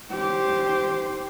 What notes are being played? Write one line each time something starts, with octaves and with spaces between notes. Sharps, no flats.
G4 C5